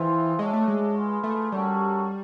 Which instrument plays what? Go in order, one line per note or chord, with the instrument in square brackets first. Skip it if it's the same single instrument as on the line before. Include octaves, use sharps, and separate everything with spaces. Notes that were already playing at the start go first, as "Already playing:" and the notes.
Already playing: [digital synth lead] E3 [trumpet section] C4 F4 G#4 C5 E5
[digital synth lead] G#3 [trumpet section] D4 F#4 A4 C#5 E5
[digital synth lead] A3
G#3
[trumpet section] F4 G#4 B4
[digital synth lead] A3
[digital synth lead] G3 [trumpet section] A#3 C#4 F#4 A4 C#5